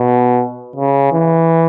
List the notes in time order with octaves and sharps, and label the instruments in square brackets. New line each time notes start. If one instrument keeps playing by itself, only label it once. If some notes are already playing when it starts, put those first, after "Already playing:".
Already playing: [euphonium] B2
C#3
E3